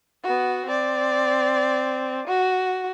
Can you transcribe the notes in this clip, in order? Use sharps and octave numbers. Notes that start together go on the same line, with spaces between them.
B3 F#4
C4 D5
F#4